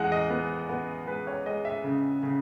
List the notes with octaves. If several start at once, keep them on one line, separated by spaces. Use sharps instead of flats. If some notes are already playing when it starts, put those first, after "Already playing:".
Already playing: E2 G#3 F#5
D#5
B3
B3
G#3 B4
C#5
G#3 D#5
E5
C#3
C#3